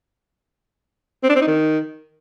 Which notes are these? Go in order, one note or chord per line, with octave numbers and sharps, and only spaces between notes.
C4
D4
C4
D#4
D#3